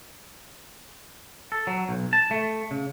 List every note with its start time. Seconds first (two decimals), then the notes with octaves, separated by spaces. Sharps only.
1.52 A4
1.67 F#3
1.89 B1
2.13 A5
2.31 A3
2.71 C#3